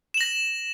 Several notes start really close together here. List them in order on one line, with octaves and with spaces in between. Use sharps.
E7 F#7 A#6